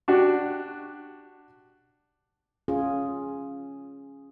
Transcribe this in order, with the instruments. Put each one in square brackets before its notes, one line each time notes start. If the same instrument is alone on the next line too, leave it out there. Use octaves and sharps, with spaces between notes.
[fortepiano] D4 F#4 G4
[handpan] C#4 F4 G#4